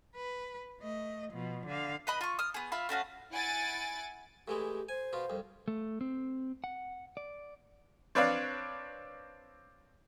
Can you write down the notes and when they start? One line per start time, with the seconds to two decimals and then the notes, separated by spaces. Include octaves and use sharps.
0.16 B4
0.81 A3 D#5
1.32 B2 F3
1.67 D3 F5
2.07 B4 D#5 B5
2.21 F4 C#6
2.39 D#6 F6
2.54 B3 G#4
2.72 F4 E5 B5
2.89 A3 C#4 F#4 F5
3.32 E4 F#5 G#5 A6 D7
4.48 A2 E3 G#3 G4
4.89 C5 G#5
5.13 B2 F4
5.30 C2 F2
5.68 A3
6.01 C4
6.64 F#5
7.17 D5
8.15 C4 D4 B4 C#5 D5 F5